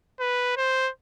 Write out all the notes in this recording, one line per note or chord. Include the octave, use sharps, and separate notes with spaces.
B4
C5